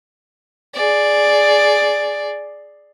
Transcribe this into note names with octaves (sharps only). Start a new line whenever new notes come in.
G#4 D5